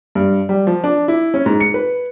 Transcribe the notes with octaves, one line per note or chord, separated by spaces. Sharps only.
G2
G3
F3
D4
E4
C#4
G#2
C#7
B4